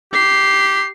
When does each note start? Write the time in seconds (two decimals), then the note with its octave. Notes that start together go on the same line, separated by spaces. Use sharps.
0.13 G4 C7